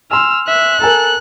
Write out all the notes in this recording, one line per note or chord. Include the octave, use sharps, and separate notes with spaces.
G#5 C6 E6 F6
E5 F#6
A4 A#4 G#5 A#5